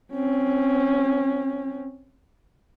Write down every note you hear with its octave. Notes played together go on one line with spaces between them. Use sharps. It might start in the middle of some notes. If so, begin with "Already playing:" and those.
C4 C#4